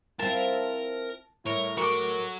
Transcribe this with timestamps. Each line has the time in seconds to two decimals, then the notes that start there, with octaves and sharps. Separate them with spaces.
0.19 C4 E4 F4 A#4 A5
1.46 A2 E4 A#4 C#5
1.77 F#3 A#4 C#6 D6